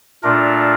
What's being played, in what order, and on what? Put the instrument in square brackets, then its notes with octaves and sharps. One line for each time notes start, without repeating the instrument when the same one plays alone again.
[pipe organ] A#2 A3 D4 F4 A#4